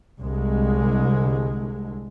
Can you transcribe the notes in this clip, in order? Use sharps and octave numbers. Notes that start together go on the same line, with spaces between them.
C2 D3 G#3